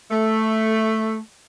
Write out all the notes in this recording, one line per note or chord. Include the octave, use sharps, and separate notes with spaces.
A3